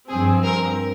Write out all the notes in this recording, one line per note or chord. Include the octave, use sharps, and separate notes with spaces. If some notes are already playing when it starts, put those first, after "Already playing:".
G2 F3 C4 G#4
A#4